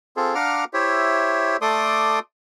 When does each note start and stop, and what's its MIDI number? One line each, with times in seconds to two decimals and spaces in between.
0.17 0.35 60
0.17 0.35 65
0.17 0.35 68
0.17 0.35 69
0.35 0.64 62
0.35 0.64 77
0.35 0.64 78
0.35 0.64 82
0.35 0.64 86
0.35 0.64 89
0.73 1.57 64
0.73 1.57 67
0.73 1.57 72
0.73 1.57 73
0.73 1.57 76
1.62 2.19 57
1.62 2.19 69
1.62 2.19 74
1.62 2.19 84
1.62 2.19 86
1.62 2.19 87